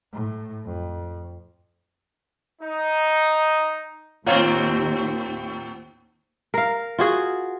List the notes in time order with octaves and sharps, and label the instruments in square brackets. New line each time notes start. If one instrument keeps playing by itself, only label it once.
[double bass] A2
F2
[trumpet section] D#4
[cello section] D#2 [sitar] A2 C4 [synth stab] F4 C#5 F5
[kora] A#4 F5
F4 F#4 G#4